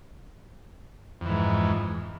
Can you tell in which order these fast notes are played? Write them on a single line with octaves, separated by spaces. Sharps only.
F2 E3 G#2